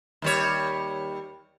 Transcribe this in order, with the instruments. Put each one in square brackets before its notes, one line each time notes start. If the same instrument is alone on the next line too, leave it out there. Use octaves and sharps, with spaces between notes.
[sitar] D#2 G3 C#5